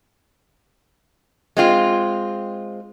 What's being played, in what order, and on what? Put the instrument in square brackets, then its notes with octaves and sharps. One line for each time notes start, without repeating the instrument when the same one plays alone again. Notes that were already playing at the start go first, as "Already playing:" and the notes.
[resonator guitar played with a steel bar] G#3 C4 F4